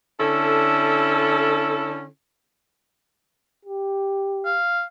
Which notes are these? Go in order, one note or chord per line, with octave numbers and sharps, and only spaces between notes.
D3 C#4 E4 A4
G4
F5